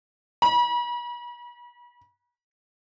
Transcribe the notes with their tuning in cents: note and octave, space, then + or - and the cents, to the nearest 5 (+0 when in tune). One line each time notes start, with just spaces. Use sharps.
B5 -40